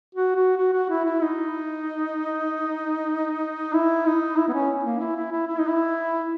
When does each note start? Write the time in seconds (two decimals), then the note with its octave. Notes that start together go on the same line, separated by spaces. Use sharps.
0.15 F#4
0.36 F#4
0.57 F#4
0.73 F#4
0.89 E4
1.04 E4
1.21 D#4
3.73 E4
4.06 D#4
4.37 E4
4.48 B3
4.53 C#4
4.84 A#3
5.00 E4
5.16 E4
5.32 E4
5.47 E4
5.58 D#4
5.67 E4